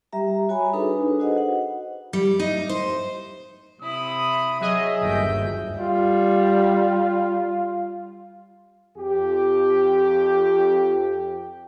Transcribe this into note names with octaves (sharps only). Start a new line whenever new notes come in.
G3 G4 E5 A#5
F#4 C#5 G#5 B5
D4 D#4 G#4 A4 B4
F#4 C5 D#5 F#5
F#5
G3
D#4
C5
C3 E4 B5 D#6
F#3 G#4 D#5 E5
G1 D#2 F#4 G5 G6
G3 F4
F2 G4